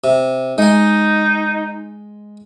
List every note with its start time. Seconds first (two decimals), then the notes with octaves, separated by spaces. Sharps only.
0.04 C3
0.58 G#3 D#4 G#5